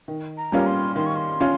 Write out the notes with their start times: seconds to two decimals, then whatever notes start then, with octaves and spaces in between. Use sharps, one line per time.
0.08 D#3
0.37 A#5
0.52 G3 A#3 C#4 F4
0.66 C6
0.96 D#3 C6
1.06 C#6
1.16 C6
1.41 C#4 F4